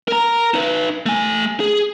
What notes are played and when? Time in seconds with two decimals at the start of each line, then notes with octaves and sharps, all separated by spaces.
0.08 A#4 A#5
0.54 D#4 B4
1.06 A3 G#5
1.60 G#4